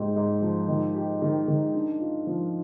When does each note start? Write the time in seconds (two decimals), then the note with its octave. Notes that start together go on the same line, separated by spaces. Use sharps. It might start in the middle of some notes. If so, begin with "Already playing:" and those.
Already playing: G#2 G4
0.16 G#2
0.42 F3
0.68 D#3
0.95 G4
1.22 D#3
1.48 D#3
1.74 D4
2.00 F4
2.27 F3